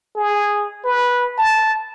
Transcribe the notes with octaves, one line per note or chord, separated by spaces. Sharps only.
G#4
B4
A5